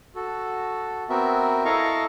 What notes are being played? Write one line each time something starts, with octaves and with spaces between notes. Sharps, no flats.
F#4 A4
B3 C4 F#4 A#4 E5
E4 A4 D#5 F5 A#5 C#6